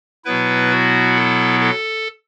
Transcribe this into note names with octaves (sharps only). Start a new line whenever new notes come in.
B2 F#3 B3 E4 B4
F#4
A4
A4